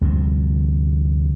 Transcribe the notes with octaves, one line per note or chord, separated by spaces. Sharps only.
D2 G2 C3 F3